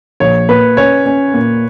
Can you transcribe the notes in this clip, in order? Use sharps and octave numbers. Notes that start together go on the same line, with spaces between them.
A#1 C#5
A#2 B4
C#4 C#5
C#4
A#2